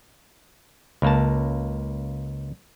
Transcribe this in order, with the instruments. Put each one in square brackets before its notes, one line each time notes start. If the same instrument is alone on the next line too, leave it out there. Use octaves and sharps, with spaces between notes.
[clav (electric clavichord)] C#2 A#3 A5